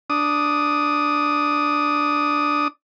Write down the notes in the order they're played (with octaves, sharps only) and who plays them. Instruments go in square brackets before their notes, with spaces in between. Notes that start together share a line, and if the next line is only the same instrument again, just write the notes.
[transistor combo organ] D4 D#6